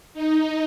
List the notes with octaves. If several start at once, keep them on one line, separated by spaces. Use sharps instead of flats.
D#4